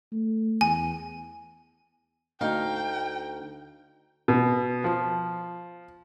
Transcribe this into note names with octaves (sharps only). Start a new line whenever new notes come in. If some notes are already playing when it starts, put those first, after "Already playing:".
A3
E2 G#5
D2 D#4 F5 G5
B2
F3